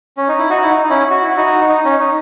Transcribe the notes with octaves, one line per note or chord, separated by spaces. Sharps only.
C#4
D#4
E4
D#4 F#4
E4
D#4
D#4
C#4 E4
F#4
E4
D#4 F#4
D#4
C#4
D#4